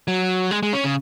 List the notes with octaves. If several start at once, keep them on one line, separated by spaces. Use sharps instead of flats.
F#3
G#3
G#3
C#4
C#3